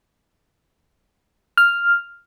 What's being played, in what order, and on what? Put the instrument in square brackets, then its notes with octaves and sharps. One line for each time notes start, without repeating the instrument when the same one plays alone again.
[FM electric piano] F6